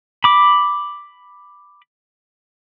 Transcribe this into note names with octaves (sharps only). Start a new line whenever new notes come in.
B5 D6